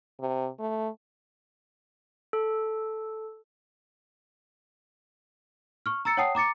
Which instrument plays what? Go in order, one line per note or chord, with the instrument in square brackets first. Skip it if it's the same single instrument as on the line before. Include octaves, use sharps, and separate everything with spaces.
[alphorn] C3
A3
[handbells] A4
[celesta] C#6 F6
A#5 E6 A6 C#7
C#5 F#5 G5 A5 D#6 C7
A#5 D6 A6 C#7